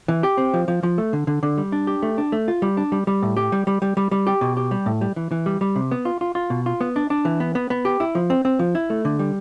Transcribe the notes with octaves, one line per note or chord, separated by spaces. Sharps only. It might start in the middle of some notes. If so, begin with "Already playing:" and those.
E3
G4
C4
F3
F3
F3
A3
D3
D3
D3
G3
D4
G4
A3
D4
A3
F4
G3
D4
G3
G3
A2
G4
G3
G3
G3
G3
G3
G4
B2
G4
G3
A2
G3
E3
E3
G3
G3
C3
B3
F4
F4
F4
B2
F4
B3
D4
D4
E3
B3
B3
B3
G4
E4
F3
C4
C4
F3
E4
A3
D3
G3